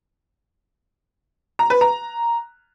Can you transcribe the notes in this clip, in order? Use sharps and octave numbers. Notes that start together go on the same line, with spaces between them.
A#5
B4
A#5